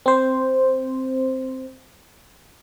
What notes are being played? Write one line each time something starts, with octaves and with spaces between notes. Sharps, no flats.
C4 C5